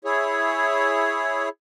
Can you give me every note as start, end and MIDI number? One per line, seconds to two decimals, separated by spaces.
0.05 1.49 64
0.05 1.49 68
0.05 1.49 73